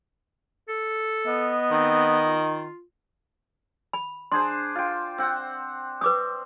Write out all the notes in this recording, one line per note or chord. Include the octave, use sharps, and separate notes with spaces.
A4
B3 D#5
D#3 C4
F4
B5
D4 G#4 C5 C6
F4 G5
C4 F#5
C4 B4 D6 D#6